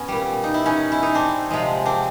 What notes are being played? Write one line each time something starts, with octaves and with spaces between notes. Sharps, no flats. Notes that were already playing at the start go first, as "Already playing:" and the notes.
Already playing: B3 C#4
A#2 G3
D#4
E4
C#4 D#4
E4
D#4
C4 D4
C3 F3 G#3
C4 D4